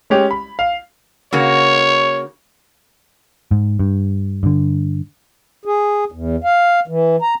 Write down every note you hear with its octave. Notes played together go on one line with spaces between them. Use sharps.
G#3 C#4 G4
B5
F5
C#3 A#3 F#4 C#5
G#2
G2
G2 D3
G#4
E2
F5
E3
A#5